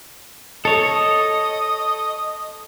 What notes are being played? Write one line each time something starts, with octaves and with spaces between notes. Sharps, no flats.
A4 C#5 D#5